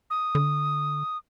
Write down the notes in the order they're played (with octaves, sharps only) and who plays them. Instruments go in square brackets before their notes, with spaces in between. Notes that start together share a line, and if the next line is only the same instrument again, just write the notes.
[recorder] D#6
[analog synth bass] D3